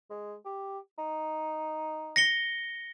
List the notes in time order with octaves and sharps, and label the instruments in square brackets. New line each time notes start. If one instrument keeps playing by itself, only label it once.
[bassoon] G#3
G4
D#4
[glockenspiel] A#6 C#7 G7